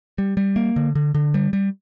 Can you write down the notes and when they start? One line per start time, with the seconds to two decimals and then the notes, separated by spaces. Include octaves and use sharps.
0.18 G3
0.37 G3
0.56 A#3
0.76 D3
0.95 D3
1.15 D3
1.34 G3
1.53 G3